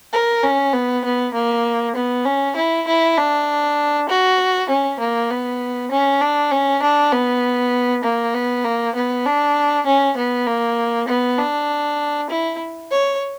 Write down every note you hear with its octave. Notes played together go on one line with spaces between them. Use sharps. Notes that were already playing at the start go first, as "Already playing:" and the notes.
A#4
C#4
B3
B3
A#3
B3
C#4
E4
E4
D4
F#4
C#4
A#3
B3
C#4
D4
C#4
D4
B3
A#3
B3
A#3
B3
D4
C#4
B3
A#3
B3
D4
E4
C#5